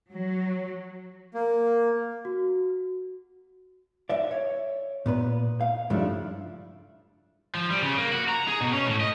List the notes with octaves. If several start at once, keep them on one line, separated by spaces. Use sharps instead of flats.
F#3
A#3
F#4
D5 E5
C#5
A#2 B3 B4
F5
G2 C#3 F3 A3 D4 E4
F3
G3
C#3
A#3
F#4
A#5
G#4
B2
C#4
A2
D#5